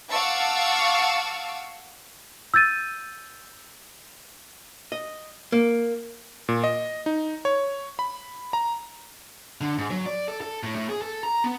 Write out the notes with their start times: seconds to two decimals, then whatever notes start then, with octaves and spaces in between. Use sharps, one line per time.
0.10 F5 F#5 A5 C#6 D6 E6
2.54 E6 G6 A6 D#7
4.92 D#5
5.52 A#3
6.48 A#2
6.64 D#5
7.06 D#4
7.45 C#5
7.99 B5
8.53 A#5
9.61 D3
9.78 G#2
9.90 F#3
10.06 D5
10.28 A4
10.41 A4
10.63 A2
10.75 A2
10.89 G#4
11.02 A4
11.23 A#5
11.44 B3